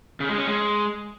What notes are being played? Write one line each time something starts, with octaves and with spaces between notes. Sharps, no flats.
C#3
G#3
C#4
G#3